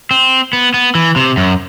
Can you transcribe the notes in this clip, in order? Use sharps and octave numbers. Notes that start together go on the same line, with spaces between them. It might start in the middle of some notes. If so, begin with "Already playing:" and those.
C4
B3
B3
E3
C3
F#2